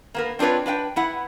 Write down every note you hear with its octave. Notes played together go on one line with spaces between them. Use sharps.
A#3 B3 A#4
C4 D4 F4 B4 C#5
D4 B4 F5 G5
B3 E4 F#5